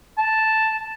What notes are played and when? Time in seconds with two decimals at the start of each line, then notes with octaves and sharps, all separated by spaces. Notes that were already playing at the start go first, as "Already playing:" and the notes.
0.18 A5